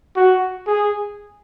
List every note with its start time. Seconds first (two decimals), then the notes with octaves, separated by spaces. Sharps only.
0.16 F#4
0.67 G#4